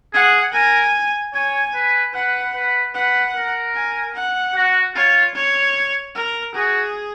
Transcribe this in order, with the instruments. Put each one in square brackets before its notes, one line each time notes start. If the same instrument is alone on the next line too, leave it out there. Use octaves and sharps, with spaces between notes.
[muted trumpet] G#4 [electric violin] F#5
[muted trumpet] A#4 [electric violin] G#5
[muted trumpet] C#5 [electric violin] G#5
[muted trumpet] B4
[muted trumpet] B4 [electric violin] F#5
[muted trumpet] B4
[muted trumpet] B4 [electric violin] F#5
[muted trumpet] A#4
[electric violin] G#5
F#5
[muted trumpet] F#4
[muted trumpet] F4 [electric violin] C#5
[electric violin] C#5
A#4
[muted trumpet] F#4 [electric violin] G#4